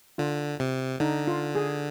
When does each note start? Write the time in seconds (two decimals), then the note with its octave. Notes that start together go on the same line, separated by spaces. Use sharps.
0.18 D3 F4
0.60 C3
1.00 D3 D#4
1.27 F4
1.55 G#4